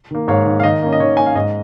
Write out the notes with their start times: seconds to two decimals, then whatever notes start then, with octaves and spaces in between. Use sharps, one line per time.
0.11 D#3 A#3
0.28 G#2 C#5 F5
0.46 D#3 A#3
0.60 F5
0.63 D#3 D#5
0.82 A#3 C#4
0.93 D#5
1.00 D#3 C#5
1.17 A#3 C#4 G#5
1.26 F5
1.35 G#2 D#5